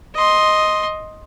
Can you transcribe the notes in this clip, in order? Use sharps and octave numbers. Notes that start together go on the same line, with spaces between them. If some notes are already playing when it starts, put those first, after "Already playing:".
D#5 C6